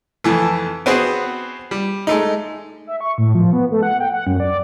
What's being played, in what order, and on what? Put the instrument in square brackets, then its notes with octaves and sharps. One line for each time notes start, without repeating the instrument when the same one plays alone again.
[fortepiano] F2 E3 A3
B3 C4 F#4 G#4
G3
G#3 A3 D#4
[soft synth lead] E5
C#6
A2
F3
B3
A3
F#5
G5
F#5
F#2
D5